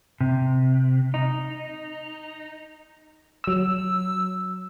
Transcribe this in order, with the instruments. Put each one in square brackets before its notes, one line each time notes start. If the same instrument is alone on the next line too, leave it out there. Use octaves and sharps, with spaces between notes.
[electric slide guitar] C3
D#4
[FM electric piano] F#3 E6